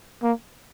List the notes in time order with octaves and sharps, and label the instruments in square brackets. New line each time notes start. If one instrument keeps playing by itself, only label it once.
[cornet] A#3